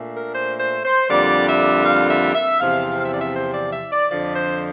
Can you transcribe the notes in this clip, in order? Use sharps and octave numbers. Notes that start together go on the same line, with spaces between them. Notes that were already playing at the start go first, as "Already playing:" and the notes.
Already playing: A#2 A3 D4
A#4
C5
C5
C5
F2 D3 G3 A#3 D4 D5
E5
F5
E5
E5
E2 C3 F3 C4 F5
F5
E5
D5
E5
C5
D5
E5
D5
F2 D3 F3 D5
C5